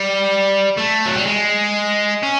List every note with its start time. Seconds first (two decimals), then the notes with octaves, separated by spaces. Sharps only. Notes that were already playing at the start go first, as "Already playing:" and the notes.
Already playing: G3
0.78 A3
1.06 F#3
1.16 G3
1.26 G#3
2.23 C#4